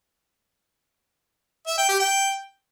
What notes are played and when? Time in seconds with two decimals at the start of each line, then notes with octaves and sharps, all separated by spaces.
1.67 E5
1.78 G5
1.89 G4
1.99 G5